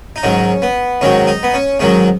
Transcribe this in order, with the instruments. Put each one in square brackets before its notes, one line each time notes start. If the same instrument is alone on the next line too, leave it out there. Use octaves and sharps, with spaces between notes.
[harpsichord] D#4
G#2 D#3 F#3 C#4
B3
G#2 D#3 F#3 C#4
D#4
B3
C#4
G#2 D#3 F#3 C#4